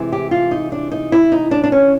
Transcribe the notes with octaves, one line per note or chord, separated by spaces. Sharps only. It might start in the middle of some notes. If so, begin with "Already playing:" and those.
Already playing: C3 E3 G#3
G4
F4
D#4
D4
D#4
E4
D#4
D4
D4
C#4